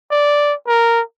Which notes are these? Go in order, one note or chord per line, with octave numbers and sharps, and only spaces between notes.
D5
A#4